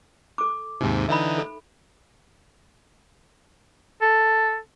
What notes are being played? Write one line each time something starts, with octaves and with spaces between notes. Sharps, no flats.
A4 D6
D#2 G#2 C3 D#4 G5
D3 E3 D#4 E5 B5
A4
A4